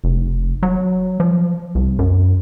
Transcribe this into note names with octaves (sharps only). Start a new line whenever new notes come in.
F1
F#3
F3
C2
F#2